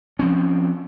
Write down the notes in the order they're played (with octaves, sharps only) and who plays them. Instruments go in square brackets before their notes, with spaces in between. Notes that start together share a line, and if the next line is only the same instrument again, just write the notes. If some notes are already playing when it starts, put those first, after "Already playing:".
[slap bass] F3 C4 C#4